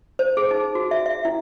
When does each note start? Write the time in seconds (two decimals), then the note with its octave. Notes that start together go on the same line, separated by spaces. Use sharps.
0.19 C5
0.37 G#4
0.51 D#4
0.75 F#4
0.91 E5
1.06 E5
1.25 E4